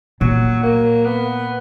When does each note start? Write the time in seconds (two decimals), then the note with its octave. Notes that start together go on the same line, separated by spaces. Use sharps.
0.21 A#2 F#3
0.63 A#3
1.05 B3